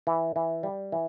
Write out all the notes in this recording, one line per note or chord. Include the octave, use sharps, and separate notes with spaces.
E3
E3
G3
E3